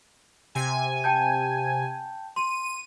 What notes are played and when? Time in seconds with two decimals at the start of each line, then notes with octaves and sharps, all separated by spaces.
0.55 C3 G#5
1.04 G5 A5 G6
2.36 C6 D#7